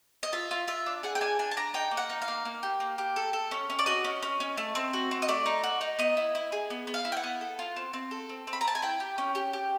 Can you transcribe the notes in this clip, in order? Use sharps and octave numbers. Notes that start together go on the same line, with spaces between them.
D#5
F4 E5
F4
F4 E5
D4
G#4 F#5
G5
D4 G#5
D4 G#5
A5
D4 A#5
D#4 G5
A#3
F#5
D#4
F5
A#3
A#3
G4
A#3
G4
A4
A4
C#4
C#4
D5
F#4 D#5
C#4
C#4
C#4
A3
C4
F#4
C4
D#5
A3 D5
D#4
F#4
D#4
B3 D#5
E4
E4
G#4
B3
B3
F5
E4
G5
F#5
B3
A4
F4
C4
C4
A4
C4
C4
B5
A#5
C4 A5
G#5
E4 G5
G4
C#4
G4
G4